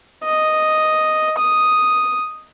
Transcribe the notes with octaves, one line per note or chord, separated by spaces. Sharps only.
D#5
D#6